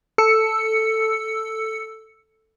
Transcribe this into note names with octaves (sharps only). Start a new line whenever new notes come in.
A4 E6 C#7